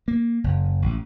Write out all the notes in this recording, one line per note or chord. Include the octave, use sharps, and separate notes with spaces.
A#3
F#1
A1